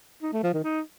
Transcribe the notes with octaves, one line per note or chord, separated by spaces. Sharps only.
D#4
A3
F3
D#3
D#4